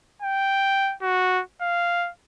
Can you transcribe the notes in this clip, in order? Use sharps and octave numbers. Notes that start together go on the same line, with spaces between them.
G5
F#4
F5